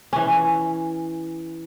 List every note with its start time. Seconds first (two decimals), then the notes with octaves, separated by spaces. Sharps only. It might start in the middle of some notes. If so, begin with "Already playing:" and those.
0.13 E3 C#4